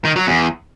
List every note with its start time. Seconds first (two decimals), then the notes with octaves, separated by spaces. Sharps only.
0.05 D#3
0.16 F#3
0.27 E2